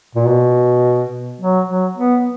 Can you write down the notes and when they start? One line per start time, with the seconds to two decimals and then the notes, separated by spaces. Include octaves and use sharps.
0.15 A#2
0.27 B2
1.41 F#3
1.68 F#3
1.97 B3